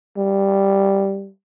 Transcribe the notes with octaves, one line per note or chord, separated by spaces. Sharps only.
G3